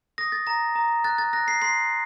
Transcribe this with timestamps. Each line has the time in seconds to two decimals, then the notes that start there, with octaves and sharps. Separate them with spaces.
0.18 D#6 A#6
0.32 A6
0.47 A#5 A#6
0.76 A#5
1.04 F#6 A6
1.18 A6
1.33 F#6 A#6
1.48 C7
1.62 C6 C7